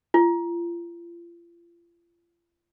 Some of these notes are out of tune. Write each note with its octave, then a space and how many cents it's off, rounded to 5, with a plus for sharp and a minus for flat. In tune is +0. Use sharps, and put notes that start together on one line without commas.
F4 -35